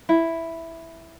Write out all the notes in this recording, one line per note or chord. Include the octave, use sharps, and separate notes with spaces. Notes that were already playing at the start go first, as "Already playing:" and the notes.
E4